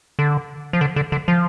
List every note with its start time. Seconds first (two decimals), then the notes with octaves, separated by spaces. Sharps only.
0.19 D3
0.73 F3
0.81 D3
0.96 D3
1.12 D3
1.28 F3